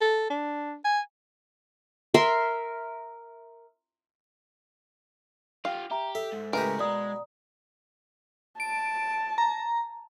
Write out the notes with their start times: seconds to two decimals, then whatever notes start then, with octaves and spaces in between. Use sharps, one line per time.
0.01 A4
0.30 D4
0.84 G#5
2.14 A#4 E5 C6
5.65 F4 G4 F5
5.91 G4 E5 A#5
6.15 A4 E5
6.33 G#2
6.53 A2 C#3 G#3 G4 A#4 B4
6.79 B2 G#3 D5 A#5 D#6
8.60 A5 D7
9.38 A#5